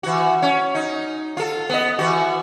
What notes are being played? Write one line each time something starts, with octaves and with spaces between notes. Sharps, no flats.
E3 F#4
C#4
D#4
F4 A4
B3 D#5
E3 F#4